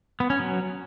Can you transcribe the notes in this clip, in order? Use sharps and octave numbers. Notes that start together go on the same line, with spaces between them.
B3
C#4
F#3